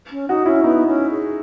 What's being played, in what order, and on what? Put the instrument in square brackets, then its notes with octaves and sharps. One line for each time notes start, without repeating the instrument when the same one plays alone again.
[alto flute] C#4
[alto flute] D#4 [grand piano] F#4
[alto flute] C#4 [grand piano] E4
[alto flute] B3 [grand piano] D#4
[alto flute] C#4
G#4